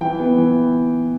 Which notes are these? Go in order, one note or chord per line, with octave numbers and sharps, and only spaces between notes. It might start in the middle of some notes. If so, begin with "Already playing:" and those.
E3 G5
B3
E3